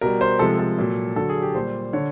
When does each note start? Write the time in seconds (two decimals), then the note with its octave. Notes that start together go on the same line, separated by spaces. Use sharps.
0.01 B2 G3 A#4
0.21 C5
0.39 C3 F3 G#3 A4
0.59 A4
0.78 A#2 F#3
1.16 D3 F#3 A4
1.29 G#4
1.42 G4
1.55 A#2 G3 C5
1.93 D3 C#5